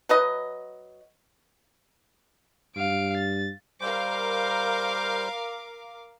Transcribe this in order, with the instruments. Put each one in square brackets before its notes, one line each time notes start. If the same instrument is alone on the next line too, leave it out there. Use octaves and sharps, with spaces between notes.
[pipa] F#3 B4 D#5
[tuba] G2 [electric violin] F5 D7
[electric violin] A6
[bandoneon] G3 C5 G6 [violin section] A#4 F5 D6